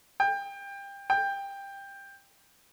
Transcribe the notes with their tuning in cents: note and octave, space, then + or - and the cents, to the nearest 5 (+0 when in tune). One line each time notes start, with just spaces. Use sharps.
G5 +25
G5 +15